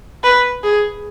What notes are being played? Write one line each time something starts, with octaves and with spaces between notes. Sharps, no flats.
B4
G#4